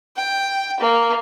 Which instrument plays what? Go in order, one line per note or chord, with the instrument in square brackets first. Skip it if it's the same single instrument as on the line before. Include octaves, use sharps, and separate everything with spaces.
[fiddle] G5
A#3